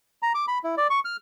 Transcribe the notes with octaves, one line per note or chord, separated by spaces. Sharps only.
A#5
D6
B5
E4
D5
C#6
F6